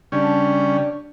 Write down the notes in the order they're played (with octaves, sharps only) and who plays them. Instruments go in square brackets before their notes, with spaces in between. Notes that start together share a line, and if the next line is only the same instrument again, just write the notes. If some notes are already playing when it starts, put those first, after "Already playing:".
[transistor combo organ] C#3 G3 C#4 [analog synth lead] D4